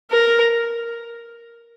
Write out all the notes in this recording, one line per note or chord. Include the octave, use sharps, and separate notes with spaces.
A#4